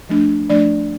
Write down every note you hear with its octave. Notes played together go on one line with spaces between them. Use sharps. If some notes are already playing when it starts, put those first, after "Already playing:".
F3 A3 D4
F3 A3 D4 D5